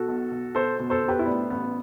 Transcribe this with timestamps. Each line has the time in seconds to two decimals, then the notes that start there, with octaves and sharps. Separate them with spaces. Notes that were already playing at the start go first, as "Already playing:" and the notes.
Already playing: B2 F#4 A4
0.08 B1
0.31 B1
0.55 B2 A4 C5
0.79 B2
0.90 A4 C5
1.03 B2
1.08 G4 B4
1.19 E4
1.26 A2 B3 D4
1.50 A1 B3